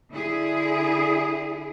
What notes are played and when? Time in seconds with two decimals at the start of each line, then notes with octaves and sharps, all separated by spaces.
0.12 D3 E4 G#4